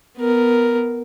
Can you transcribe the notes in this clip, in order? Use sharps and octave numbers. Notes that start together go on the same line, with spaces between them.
B3 A#4